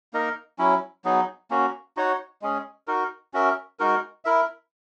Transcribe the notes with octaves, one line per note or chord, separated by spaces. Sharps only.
A#3 D#4 A#4 D#5
F#3 C#4 E4
F#3 B3 D#4 G#4
A#3 C#4 F#4
D#4 F#4 C#5 F#5
G#3 C#4 G#4
D#4 F#4 A#4
C#4 F#4 A#4 E5
G#3 D#4 F#4 A#4
E4 A#4 E5